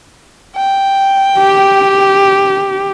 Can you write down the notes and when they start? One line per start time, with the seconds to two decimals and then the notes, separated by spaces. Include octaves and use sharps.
0.56 G5
1.39 G4